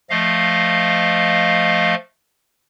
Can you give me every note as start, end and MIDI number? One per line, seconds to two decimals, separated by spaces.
0.10 1.95 53
0.10 1.95 57
0.10 1.95 75
0.10 1.95 77